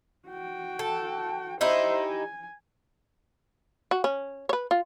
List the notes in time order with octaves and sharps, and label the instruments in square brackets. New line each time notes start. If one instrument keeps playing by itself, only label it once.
[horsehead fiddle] F#4 G5
[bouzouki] A4
[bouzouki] D#4 E4 G4 [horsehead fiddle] C5 E5
[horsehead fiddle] G#5
[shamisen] F#4
C#4
B4 C#5
F4